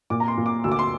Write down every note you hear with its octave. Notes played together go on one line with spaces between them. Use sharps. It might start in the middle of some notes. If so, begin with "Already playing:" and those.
A#2 D6
A#5
C6
A#2
D6
D2 E6
D6
C6